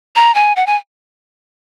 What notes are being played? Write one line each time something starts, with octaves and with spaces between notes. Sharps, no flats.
A#5
G#5
F#5
G#5